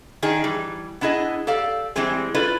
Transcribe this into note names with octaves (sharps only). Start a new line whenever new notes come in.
D#3 D4 D#4 G#4
E3 G3
B3 D4 E4 G#4 D#5
G4 A4 D5 F5
E3 G3 G#3 C4 G#4
E4 F4 A4 B4 D5